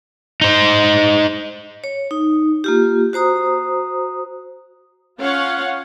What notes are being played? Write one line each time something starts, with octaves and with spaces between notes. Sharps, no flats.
D#4 C5
C#5
D#4
A#3 F4 G4
F#4 C5 A#5 D#6
C#4 F4 C#5 F5 F#5